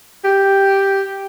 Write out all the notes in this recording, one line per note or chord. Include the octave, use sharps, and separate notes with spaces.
G4